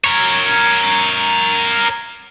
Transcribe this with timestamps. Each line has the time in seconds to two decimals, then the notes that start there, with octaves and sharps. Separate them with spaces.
0.04 A#4 C#5